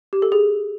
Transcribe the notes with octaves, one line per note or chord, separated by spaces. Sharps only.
G4
A4
G#4